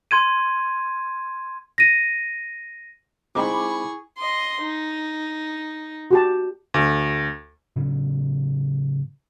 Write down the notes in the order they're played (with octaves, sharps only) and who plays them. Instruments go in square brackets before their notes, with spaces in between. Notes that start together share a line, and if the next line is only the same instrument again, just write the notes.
[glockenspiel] C6 G#6 D#7
[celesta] A#6 D#7
[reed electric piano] G#3 C4 D#4 [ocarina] E4 [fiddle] G#4 C#6 [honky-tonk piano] B5 D6
[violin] D#5 C6
D#4
[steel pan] F#4 G4 A5
[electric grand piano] D2
[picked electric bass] A2 C#3 F#3 C#4